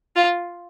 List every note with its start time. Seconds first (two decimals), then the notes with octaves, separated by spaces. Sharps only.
0.16 F4